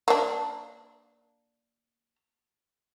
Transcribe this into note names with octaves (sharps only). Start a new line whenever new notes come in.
A#3 D4